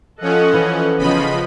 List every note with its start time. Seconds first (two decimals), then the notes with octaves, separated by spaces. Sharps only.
0.21 F3 C#4 A4 D#5 F#5
0.53 E3
0.98 E1 C#3 F3 B3 D#5 B5